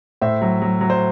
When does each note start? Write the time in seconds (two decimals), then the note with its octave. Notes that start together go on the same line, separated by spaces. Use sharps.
0.21 A2 C5 E5
0.41 F#3
0.62 F#3
0.81 F#3
0.90 C5